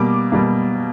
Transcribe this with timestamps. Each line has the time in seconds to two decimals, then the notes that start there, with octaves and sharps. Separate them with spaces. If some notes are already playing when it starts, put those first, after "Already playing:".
Already playing: B2 G3 A#3 D6
0.32 B2 G3 A#3